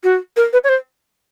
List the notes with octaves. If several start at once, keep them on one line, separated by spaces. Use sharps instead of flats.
F#4
A#4
B4
C#5
C5